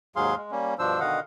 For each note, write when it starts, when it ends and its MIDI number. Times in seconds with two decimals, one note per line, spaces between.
0.16 0.35 39
0.16 0.35 44
0.16 0.35 54
0.16 0.35 68
0.16 0.35 77
0.16 0.35 84
0.37 0.51 56
0.51 0.74 55
0.51 0.74 58
0.51 0.74 61
0.79 1.00 43
0.79 1.00 47
0.79 1.00 53
0.79 1.00 62
0.79 1.00 72
0.79 1.00 88
1.00 1.20 47
1.00 1.20 50
1.00 1.20 51
1.00 1.20 75
1.00 1.20 77
1.00 1.20 78